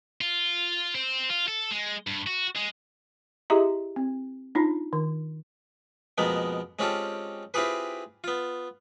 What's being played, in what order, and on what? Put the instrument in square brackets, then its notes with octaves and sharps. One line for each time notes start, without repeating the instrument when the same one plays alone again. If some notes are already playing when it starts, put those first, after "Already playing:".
[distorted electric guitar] F4
C4
F4
A4
G#3
G2
F#4
G#3
[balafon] E4 G4 G#4 D#5 E5 A#5
C4
D4 D#4 F4
D#3
[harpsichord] F2 B2 G#3 A#3 B3
G#3 C4 C#4 F4 G4 A4
C4 E4 F4 G4 G#4 B4
B3 F4